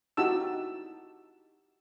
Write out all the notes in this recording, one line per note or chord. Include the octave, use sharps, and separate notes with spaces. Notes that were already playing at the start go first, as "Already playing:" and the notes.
D#4 E4 F#4 G4 A5 E6